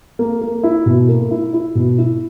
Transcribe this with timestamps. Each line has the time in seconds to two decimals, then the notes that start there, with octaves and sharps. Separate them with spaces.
0.19 A#3
0.41 A#3
0.63 E4
0.86 B2
1.09 A#3
1.31 E4
1.53 E4
1.75 B2
1.98 E4